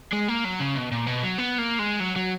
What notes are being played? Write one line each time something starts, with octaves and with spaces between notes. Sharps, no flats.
G#3
A#3
F#3
C#3
B2
A#2
B2
F#3
B3
A#3
G#3
F#3
F#3